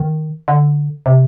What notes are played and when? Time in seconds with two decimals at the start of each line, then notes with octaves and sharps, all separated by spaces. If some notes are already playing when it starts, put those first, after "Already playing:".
Already playing: D#3
0.48 D3
1.06 C3